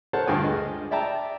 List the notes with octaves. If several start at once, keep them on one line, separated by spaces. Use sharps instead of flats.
A4 A#4 C5 C#5 F#5 A5
D2 G2 F4 G5 G#5 D#6
G#3 D#5
D5 E5 G5 A5 A#5